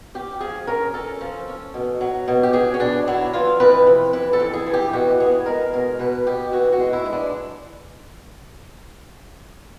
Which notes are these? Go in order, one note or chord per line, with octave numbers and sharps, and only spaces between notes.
C#4 G4
F3 G#4
C#4 A#4
C#4 A4
F3
C#4
B2
F#3
B2
G4
F#3 G#4
C#4
B2 D4
F#3 E4
E3 F4
F2 B4
C3
E3 B4
A4
F2
G#4
E3
G4
B2 F#4
B3 G#4
G#3 A#4
B2 A#4
B2 B4
B2 G4
E3 F#4
F#4
G#3
E4
G#3
D4